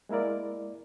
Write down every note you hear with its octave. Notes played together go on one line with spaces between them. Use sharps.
G#3 A#3 E4 A#4 D5